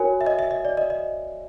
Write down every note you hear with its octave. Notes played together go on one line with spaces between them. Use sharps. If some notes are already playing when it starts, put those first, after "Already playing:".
Already playing: F#4 A#4 C#5 G#5
E5
D#5
E5
D#5
D5
D#5
D#5